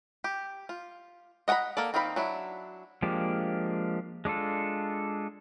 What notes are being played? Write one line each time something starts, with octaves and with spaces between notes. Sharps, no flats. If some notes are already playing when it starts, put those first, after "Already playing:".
G4
F4
D#5 F#5 G5 A#5 B5
A#3 A4 D5
D#3 C4 D#4 F5 B5
F#3 D4 E4
F3 G#3 A#3 D4 G4
G#3 D4 F4 A4